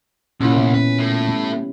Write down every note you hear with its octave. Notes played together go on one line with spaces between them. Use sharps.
C2 A#2 C#4 E4
B3
C#4 B4
A2
G3